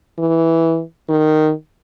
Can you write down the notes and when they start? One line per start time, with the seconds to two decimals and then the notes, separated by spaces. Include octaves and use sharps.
0.19 E3
1.09 D#3